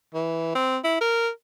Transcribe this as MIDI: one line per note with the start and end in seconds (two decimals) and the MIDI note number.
0.14 0.52 52
0.55 0.77 60
0.84 1.00 64
1.01 1.29 70